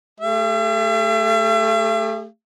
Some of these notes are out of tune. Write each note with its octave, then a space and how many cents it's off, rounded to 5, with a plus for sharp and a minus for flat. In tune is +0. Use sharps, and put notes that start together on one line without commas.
A3 -5 G4 +40 E5 +45